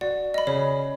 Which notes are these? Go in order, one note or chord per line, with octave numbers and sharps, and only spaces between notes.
F#4 D5
D#5 B5
C#3 C#5